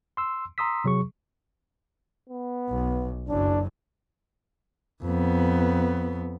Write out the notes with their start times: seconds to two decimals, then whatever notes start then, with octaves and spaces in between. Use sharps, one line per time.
0.17 C6 E6
0.58 A#5 C6 D#6 E6 B6
0.84 C3 F#3 G#4 C#6
2.29 B3
2.69 B1
3.29 F#1 F#2 D4
5.04 F2 B3